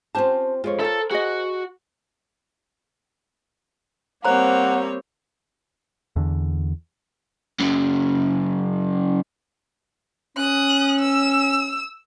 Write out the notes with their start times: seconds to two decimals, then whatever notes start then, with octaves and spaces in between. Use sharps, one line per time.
0.15 C4 C#4 F4 G4 C5 A5
0.64 F2 G#3 F4 C#5
0.80 A4 A#4 C5 A5
1.11 F#4 G#4 D#5
4.25 G3 A#3 C4 C5 C#5 F#5 A#5
6.16 E2 D3
7.60 F#2 C#3
10.37 C#4 D#6 F#6
11.00 E6